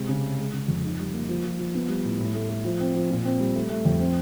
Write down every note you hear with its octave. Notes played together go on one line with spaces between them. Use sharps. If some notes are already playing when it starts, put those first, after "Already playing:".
Already playing: C3 G#3
C#3
G#3
G#3
C#3
F2
D#4
G3
A#3
F3
F3
F3
B3
G3
A2
A2
A3
A3
F3
C4
F3
A#2
C4
G3
A3
A3
F2
C4